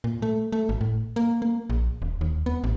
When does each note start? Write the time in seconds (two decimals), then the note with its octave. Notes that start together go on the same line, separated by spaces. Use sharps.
0.04 A#2
0.22 A3
0.52 A3
0.69 G#1
0.81 A2
1.16 A#3
1.42 A#3
1.70 A#1
2.02 D#1
2.21 D#2
2.46 B3
2.64 A1